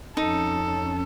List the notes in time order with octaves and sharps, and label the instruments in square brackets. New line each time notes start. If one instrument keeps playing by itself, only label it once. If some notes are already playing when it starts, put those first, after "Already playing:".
[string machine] F2 C#4 [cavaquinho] D#4 [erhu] A4